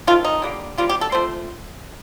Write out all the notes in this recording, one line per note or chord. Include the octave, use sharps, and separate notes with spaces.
D#3 A3 C4 F4
D#4
D3 G3 A#3
C3 G3 A#3 F4
G4
A4
F3 A3 C4 C5